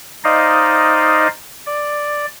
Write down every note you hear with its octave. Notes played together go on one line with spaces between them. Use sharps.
D#4 C5 D5 D#5 F5
D5